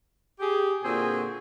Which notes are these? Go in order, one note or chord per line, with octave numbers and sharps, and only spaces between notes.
G4 G#4
A#2 D3 C4 F4 F#4 G#4